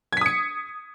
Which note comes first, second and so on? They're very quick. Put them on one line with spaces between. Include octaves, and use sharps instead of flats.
G#6 B6 D#6 C#7